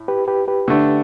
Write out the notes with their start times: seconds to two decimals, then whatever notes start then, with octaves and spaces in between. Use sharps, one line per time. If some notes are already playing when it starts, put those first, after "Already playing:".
Already playing: A2
0.08 G4 B4
0.28 G4 B4
0.48 G4 B4
0.68 D3 A3 D4